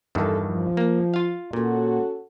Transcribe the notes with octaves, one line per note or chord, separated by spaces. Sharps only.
E2 G2 D#3 A4
F3
A#3
F4 F5
A#2 C#4 F#4 A4